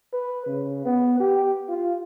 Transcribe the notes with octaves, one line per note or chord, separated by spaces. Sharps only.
B4
C#3
B3
G4
F4